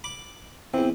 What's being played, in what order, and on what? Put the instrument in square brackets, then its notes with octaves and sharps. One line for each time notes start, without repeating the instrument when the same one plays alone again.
[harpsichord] B5 D6
[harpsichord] E2 E3 [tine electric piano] C4